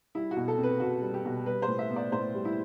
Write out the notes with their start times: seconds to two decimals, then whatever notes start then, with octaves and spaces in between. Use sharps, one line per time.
0.15 G3 E4
0.31 F#4
0.36 B2
0.48 A4
0.58 C4
0.63 B4
0.80 B2 F#4
1.02 G3
1.14 G4
1.25 B2
1.46 G3 B4
1.62 C5
1.68 A2
1.79 E5
1.90 B3
1.96 D5
2.12 A2 C5
2.34 G3
2.45 E4